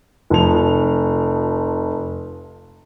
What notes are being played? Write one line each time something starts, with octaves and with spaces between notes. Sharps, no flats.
F1 F3 F7